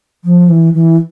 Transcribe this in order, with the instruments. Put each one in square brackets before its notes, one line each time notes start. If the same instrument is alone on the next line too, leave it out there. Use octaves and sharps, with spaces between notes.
[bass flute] F3
E3
E3